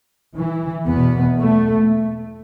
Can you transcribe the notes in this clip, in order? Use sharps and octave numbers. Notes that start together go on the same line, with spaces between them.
E3
E2 B2 B3
A3